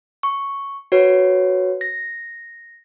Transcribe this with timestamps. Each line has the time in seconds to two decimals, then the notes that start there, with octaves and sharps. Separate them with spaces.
0.23 C#6
0.92 F#4 B4 C#5
1.81 A#6